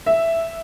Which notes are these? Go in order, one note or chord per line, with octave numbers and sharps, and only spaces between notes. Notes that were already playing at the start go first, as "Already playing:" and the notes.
E5